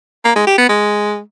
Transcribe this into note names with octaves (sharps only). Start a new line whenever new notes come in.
A#3
G#3
G4
B3
G#3